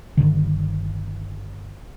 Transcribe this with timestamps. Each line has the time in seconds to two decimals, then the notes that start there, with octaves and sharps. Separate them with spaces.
0.17 G1 B2 D3 D#3